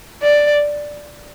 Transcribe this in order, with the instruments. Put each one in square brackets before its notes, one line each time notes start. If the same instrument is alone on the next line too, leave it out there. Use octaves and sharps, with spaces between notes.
[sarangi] D5